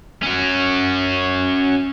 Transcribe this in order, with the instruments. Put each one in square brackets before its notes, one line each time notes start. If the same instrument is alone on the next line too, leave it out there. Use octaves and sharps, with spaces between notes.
[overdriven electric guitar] C#4 F#4